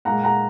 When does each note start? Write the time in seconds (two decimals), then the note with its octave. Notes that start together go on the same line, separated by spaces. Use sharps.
0.05 A#2 G#3 F#5 A#5
0.23 F#5 A#5